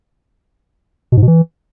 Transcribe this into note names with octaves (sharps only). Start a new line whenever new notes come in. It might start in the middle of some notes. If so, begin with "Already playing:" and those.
B2
G#2
B2
E3